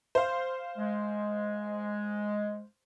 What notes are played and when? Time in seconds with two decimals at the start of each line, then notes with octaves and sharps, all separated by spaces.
0.15 C5 F5
0.77 G#3